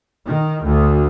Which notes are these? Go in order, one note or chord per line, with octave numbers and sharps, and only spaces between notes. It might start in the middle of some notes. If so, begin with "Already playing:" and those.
D#3
D2